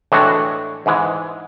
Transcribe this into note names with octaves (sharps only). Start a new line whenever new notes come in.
A2 E3 G#3 D4 F#4
G#2 E3 G#3